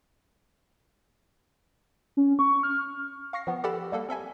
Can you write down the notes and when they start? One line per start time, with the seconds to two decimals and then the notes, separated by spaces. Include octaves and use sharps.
2.17 C#4
2.39 C#6
2.63 F6
3.33 F5 C#6 A#6 C7
3.47 F3 B3
3.64 G4 A4 D5 F#5 B5 E6
3.92 G3 A#3 A4 F#5
4.09 C4 A4 E5 G#5